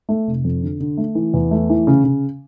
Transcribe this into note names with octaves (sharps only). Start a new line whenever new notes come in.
A3
F1
F2
D3
D3
A3
E3
E2
A3
E3
C#3
C#3